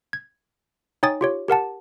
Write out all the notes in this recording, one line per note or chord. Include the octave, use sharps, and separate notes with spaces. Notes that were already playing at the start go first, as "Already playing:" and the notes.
G#6
D#4 C#5 G5 G#5 D#6 A6
F4 G4 C#5
G4 A#4 F#5 A5